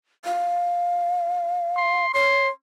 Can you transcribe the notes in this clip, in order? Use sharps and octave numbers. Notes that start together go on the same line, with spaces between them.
F5
C6
C#5 C6